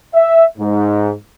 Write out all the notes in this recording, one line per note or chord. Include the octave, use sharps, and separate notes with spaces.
E5
G#2